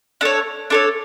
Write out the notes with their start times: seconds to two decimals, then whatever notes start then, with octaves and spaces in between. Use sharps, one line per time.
0.21 D4 A4 C#5
0.70 D4 A4 C#5